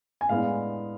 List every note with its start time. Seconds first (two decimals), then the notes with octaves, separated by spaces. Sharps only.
0.21 G#5
0.29 A2 G#3 B3 D4 F5